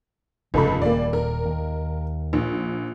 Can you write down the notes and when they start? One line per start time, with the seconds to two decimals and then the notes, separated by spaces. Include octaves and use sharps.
0.54 F1 C#2 G2 C#3 A4 B5
0.82 D#1 A#3 D5
1.13 A#4
1.45 D#2
2.33 A#1